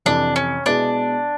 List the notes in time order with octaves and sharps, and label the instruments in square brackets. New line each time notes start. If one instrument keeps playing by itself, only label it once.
[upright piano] F2 C3 E3 [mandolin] D4
[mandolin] C#4
[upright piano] B2 G#3 B3 E4 G#4 [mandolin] D4